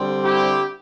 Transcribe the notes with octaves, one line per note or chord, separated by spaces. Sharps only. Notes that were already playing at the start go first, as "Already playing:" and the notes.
Already playing: D3 G3 C4
E4 G4